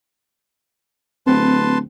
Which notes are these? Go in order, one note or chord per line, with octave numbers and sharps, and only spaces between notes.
D1 C4 B4 A5 C6